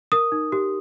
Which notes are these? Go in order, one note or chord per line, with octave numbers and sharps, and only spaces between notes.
A#4 D#6
D#4
G4